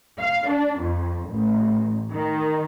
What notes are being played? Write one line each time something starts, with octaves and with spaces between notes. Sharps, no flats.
F5
D4
F2
A1
D#3